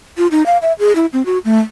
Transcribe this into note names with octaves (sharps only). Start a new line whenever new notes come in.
F4
D#4
F5
E5
G#4
E4
C4
F#4
A3